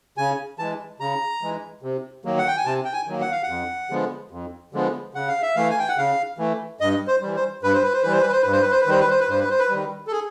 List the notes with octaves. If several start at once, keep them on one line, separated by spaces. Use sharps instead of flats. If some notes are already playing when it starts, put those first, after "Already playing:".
C#3 G#5
E3 G#3 A5
C#3 A#5
E3 G#3
C3
D#3 F#3 A#3
F#5
G5
G#5
C3 A5
G5
G#5
D#3 F#3 A#3
F#5
F5
F#5
F2
D3 F3 G#3 B3
F2
D3 F3 G#3 B3
C#3 F#5
F5
E5
E3 A3 F5
G#5
G5
F#5
C#3 F5
E3 A3
G2 D#5
C5
E3 G3
C5
G2 B4
C5
B4
C5
E3 G3 B4
C5
B4
C5
G2 B4
C5
B4
C5
B4
D#3 G3 C5
B4
C5
B4
G2 C5
B4
C5
B4
D#3 G3
A4
G#4